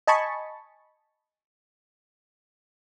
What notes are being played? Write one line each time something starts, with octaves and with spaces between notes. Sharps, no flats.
D#5 G#5 A5 B5 C#6